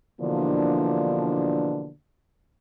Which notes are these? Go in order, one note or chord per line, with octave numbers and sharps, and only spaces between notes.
B2 D3 E3 F3 A#3 D4